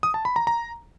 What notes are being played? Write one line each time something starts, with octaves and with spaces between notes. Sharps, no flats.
D#6
A5
B5
A#5
A#5